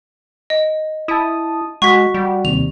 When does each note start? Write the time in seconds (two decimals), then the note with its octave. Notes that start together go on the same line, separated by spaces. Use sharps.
0.50 D#5
1.08 E4 A5 D#6
1.82 G#3 F#4 F#5 C#6 B6
2.14 G3
2.45 D#2 C3 F7